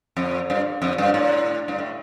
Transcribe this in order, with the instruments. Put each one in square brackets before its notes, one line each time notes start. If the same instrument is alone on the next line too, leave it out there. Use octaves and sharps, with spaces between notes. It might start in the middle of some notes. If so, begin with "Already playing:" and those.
[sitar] F2
G2
F2
G2
A2
G2
A2